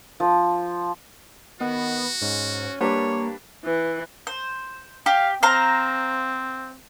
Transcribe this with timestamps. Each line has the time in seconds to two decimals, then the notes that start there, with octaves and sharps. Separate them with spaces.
0.20 F3
1.61 D#3 B3 F#4
2.21 G#2 C#4
2.81 G3 A#3 D4 B4 C#5
3.65 E3
4.27 C5
5.06 G4 F5
5.43 C4 C5 F5 A#5